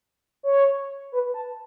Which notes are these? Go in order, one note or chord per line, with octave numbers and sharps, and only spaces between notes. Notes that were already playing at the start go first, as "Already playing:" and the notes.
C#5
B4
A5